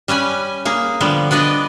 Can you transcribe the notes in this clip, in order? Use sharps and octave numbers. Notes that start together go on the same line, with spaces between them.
G3 C#4 B4 G#5
A#3 G#4
D3 F3 G3 B3
B3 D4 B4 D5 D#5